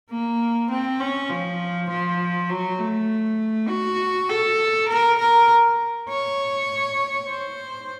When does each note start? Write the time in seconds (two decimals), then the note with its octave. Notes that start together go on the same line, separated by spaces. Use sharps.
0.11 A#3
0.70 C4
1.00 C#4
1.30 F3
1.89 F3
2.50 F#3
2.80 A3
3.69 F#4
4.29 A4
4.89 A#4
5.19 A#4
6.09 C#5
7.29 C5